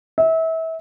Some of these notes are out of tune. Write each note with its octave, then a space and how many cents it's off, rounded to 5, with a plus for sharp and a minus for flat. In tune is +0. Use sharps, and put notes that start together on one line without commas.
E5 -30